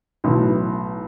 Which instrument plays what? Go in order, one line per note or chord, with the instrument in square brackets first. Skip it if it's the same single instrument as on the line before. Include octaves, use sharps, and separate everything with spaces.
[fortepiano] B1 A2 E3